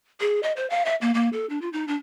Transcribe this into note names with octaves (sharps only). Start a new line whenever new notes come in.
G#4
D#5
C5
F5
E5
A#3
A#3
A4
D4
F4
D#4
D4